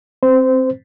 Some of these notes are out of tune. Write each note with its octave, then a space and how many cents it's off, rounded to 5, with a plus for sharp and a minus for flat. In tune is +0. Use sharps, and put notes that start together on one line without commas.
C4 +10 C5 -20